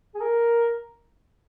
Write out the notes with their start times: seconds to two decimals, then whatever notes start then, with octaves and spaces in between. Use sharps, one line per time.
0.14 G#4
0.21 A#4